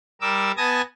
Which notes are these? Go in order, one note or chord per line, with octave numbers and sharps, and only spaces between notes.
G3 A#4 D6 E6
B3 G#5 A5 D#6 G#6 A#6